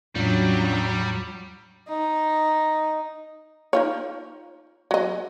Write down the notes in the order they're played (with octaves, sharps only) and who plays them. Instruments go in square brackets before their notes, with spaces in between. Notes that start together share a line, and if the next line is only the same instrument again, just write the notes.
[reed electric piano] E2 A2 [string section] F#3 [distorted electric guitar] G3 [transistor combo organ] C#4 D4 F4
[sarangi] D#4
[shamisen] D#4 F4 C#5
F#3 D#5